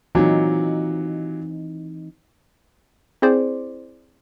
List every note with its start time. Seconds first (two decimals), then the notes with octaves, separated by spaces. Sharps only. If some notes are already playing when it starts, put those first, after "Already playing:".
0.15 A#2 E3 F#3 C4 D#4
3.22 C4 E4 G#4 C5 D5